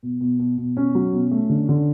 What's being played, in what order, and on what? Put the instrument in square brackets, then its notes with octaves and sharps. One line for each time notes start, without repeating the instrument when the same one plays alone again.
[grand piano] B2
B2
B2
B2
B2 C#4
F#3
B2
A3
D3
D3